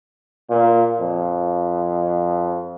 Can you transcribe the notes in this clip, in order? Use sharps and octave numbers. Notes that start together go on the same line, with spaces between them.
A#2
F2